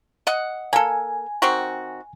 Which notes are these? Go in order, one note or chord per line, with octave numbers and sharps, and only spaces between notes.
D#5 F#5
A#3 A4 G#5
D#3 C4 F#4